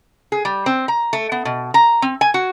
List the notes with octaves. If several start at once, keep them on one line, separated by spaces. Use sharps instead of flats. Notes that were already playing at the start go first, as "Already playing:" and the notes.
G#4
G3
C4
A#5
A3
B3
B2
A#5
C4
G#5
F#4